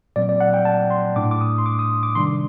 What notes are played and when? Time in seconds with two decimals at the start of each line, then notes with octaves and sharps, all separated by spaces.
0.16 A#2 F#3 C4 D5
0.29 D5
0.40 F#5
0.54 G5
0.65 A5
0.91 C6
1.16 A2 A3 D4 D6
1.31 D6
1.41 D#6
1.58 C6
1.66 D6
1.79 D#6
2.03 D6
2.15 C3 D#3 G3 D4 C6